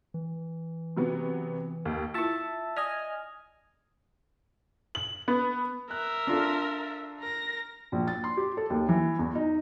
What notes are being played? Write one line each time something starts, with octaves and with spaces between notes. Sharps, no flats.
E3
C3 F#3 B3
D#2
E4 F4 E5 A5
D5 D#5 G#5 F6
F#7
B3
A#4 E5 F#6
D4 F4 A4
A#4 A#6
A#1
A6
C6
G4
A4
D#2
E3
E2
D#4